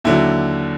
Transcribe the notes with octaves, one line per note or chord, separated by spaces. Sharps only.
D#2 D3 F#3 E4